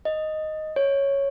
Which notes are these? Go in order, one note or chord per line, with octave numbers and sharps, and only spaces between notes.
D#5
C#5